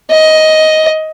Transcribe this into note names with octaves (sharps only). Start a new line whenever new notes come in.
D#5